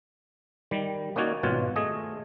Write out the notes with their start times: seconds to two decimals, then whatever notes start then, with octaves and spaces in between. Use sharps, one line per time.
0.71 D#3 G3
1.16 A#3 C#4 D#4 F#4 C#5 D5
1.43 G#1 B2 F4 C#5 F#5
1.76 A3 G#4 D#5